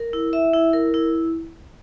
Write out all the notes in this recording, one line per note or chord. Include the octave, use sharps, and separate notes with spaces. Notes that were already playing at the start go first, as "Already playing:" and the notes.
Already playing: A#4
E4
E5
E4
A#4
E4